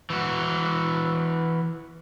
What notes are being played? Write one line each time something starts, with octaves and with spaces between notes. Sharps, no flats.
E3 F#4